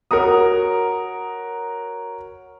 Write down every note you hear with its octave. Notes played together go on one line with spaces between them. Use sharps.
F#4 A#4 C#5 A#5 D#6